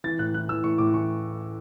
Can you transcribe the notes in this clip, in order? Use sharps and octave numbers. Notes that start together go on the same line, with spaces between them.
E3 A6
A2 F#6
E3 F#6
E3 E6
A2 C#6
A2 D6
E3 C#6